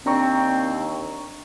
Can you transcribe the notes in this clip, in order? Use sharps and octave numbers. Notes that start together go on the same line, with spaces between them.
D#2 C4 D4 A#5 C#6